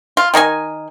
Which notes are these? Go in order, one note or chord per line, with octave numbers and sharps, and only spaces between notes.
F4
D#3 D#4 G4 G#5